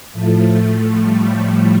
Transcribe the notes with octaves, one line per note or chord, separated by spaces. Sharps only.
A2 F3 A3
G3
A3